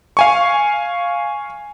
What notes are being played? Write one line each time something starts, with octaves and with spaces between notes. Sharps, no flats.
F5 G#5 C#6